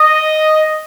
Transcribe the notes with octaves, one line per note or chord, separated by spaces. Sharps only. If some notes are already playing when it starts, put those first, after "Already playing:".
Already playing: D#5